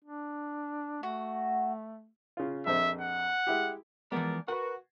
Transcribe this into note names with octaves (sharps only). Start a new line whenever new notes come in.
D4
A3 F#4
C#3 F4
A#1 F2 C5 E5
F#5
G#3 E4 G4
E3 F3 G#3 B3 A#4 D5
F#4 A#4 B4 F#5